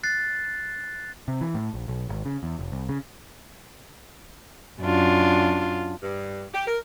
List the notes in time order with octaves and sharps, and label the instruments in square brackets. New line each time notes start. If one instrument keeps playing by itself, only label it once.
[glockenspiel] F#6 A6 C7
[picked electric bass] C3
E3
A2
A#1
B1
G#1
C#3
E2
F1
C2
C#3
[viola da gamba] F#2 D4 F4
[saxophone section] G2
G4
A#4